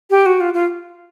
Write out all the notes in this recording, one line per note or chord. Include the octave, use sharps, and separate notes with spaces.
G4
F#4
F4
F4